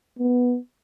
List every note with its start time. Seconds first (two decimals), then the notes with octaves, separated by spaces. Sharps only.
0.19 B3